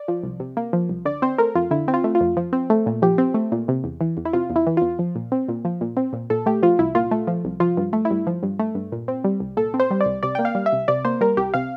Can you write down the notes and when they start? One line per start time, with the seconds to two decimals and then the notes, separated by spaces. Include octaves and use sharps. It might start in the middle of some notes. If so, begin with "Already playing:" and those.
Already playing: D5
0.08 F3
0.23 C2
0.40 C3
0.57 A#3
0.73 F3
0.89 C2
1.05 D3 D5
1.22 C4 C5
1.38 A3 A#4
1.55 F2 F4
1.71 D3 E4
1.88 C4
1.94 F4
2.04 A3
2.15 F4
2.21 F2
2.37 F3
2.53 C4
2.70 A3
2.86 A#2
3.02 F3 G4
3.18 C4
3.34 A3
3.52 A#2
3.68 C3
3.84 E2
4.01 E3
4.17 E2
4.25 E4
4.33 C3 F4
4.50 E2
4.56 E4
4.67 E3
4.77 E2 F4
4.99 F3
5.15 A#2
5.32 C4
5.48 A#2
5.65 F3
5.81 A#2
5.97 C4
6.13 A#2
6.30 A#2 A4
6.46 A3 G4
6.62 F3 F4
6.79 C2 E4
6.95 A#2 F4
7.11 A3
7.27 F3
7.45 C2
7.60 F3 F4
7.77 G2
7.93 A3
8.05 E4
8.10 G2
8.27 F3
8.43 G2
8.59 A3
8.75 G2
8.92 A#2
9.08 C4
9.24 G3
9.40 C2
9.57 A#2 A4
9.74 C4
9.80 C5
9.91 G3
10.01 D5
10.06 C2
10.23 C3 D5
10.35 A#3 G5
10.45 F5
10.55 G3
10.66 E5
10.72 C2
10.88 C3 D5
11.05 A#3 C5
11.21 G3 A#4
11.37 C2 G4
11.54 C3 F5